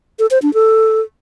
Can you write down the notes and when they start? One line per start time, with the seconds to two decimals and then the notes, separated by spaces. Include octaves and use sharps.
0.19 A4
0.31 C5
0.42 D4
0.54 A4